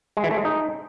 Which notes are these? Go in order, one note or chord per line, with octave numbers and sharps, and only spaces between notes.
G#3
E3
A3
G#3
D#4